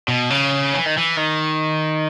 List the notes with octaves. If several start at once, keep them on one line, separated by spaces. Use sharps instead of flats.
B2
C#3
E3
D#3
E3
D#3